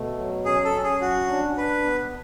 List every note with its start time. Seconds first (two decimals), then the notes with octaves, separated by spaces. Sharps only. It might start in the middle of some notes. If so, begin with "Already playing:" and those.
Already playing: B2 A3
0.18 F#3
0.45 C#4 G#4
0.64 A4
0.74 C#4
0.84 G#4
1.01 F#3 F#4
1.29 D4
1.57 D4 B4
1.84 B3